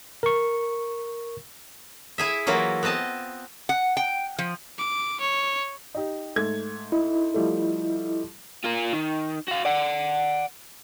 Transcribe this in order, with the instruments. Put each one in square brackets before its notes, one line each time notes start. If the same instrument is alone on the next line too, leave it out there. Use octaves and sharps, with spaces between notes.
[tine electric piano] A#4 C#6
[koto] E4 G#4 E5
E3 F#3 A#3 E4 F4 A#4
B3 C4 D#5 A5
[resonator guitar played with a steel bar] F#5
G5
F3
[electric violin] D6
C#5
[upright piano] D#4 G4
G#2 A3 G#6
[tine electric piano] E4 D#5
[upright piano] F3 G3 A3
[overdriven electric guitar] F4 A#4
D#3
F#4 F5
D5 F#5